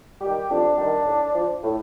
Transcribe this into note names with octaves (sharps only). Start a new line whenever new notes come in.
D#3 G3 G4
F2 D4
D#3 G3
A2
F3
A2